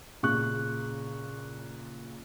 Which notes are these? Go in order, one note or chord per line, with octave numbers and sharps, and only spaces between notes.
A#2 C#3 C#6 F#6